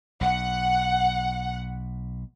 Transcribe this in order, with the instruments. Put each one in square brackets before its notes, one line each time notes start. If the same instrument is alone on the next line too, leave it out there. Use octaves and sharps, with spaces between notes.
[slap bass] B1 [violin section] F#5